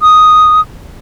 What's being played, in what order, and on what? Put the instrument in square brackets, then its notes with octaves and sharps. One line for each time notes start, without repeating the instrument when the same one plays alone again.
[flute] D#6